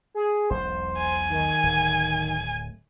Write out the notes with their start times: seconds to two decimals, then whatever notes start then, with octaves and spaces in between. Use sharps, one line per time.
0.14 G#4
0.50 E1 B1 C5
0.98 G#5
1.30 D#3
1.63 D1